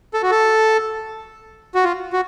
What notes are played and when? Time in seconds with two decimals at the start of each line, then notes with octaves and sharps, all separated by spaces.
0.14 A4
0.23 F#4
0.31 A4
1.75 F#4
1.84 F4
2.13 F#4